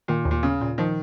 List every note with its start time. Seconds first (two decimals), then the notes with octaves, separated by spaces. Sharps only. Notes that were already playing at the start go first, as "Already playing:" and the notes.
0.08 A#2 D#3
0.25 D#2
0.31 A#2
0.43 C#3 C#4
0.61 A#2
0.78 D#3 F3